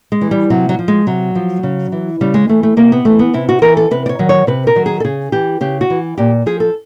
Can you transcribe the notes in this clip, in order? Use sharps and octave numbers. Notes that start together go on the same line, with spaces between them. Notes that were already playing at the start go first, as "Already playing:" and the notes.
G#3
E3
G3
C3 F#3
F#3
F3
G#3
C3 F#3
F3
C#3
E3
C#3 G3
G#3
E3 A3
A3
C3 A#3
B3
E3 A3
B3
C3 E4
F#4
E3 A#4
A4
C3 B4
D5
C#5
D#3 F#3
C#5
C3 B4
A#4
D#3 F#3
G#4
A4
C#3 G#4
E3 G4
C#3 G4
F#4
E3
A#2 G4
F3 G#4
A4